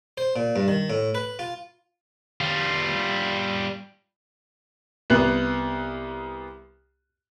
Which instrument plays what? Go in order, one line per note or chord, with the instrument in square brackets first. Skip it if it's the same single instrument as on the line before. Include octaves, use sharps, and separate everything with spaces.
[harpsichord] C5
A#2
G2
D#3
A2
B4
F4
[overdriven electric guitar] G3 F4
[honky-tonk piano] C2 B3 F#6